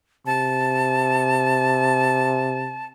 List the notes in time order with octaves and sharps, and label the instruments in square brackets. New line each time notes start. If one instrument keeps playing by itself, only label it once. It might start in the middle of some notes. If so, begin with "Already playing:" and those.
[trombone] C3 [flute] A5